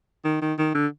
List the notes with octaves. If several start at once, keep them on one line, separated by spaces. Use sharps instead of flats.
D#3
D#3
D#3
D3